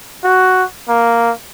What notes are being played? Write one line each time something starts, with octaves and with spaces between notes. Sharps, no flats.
F#4
A#3